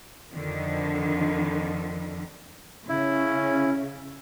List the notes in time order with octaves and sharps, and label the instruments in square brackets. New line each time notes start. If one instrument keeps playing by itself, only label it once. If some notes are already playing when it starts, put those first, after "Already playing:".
[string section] F2 D3 D#3 F3
[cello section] C#3 [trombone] C#4 [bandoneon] E4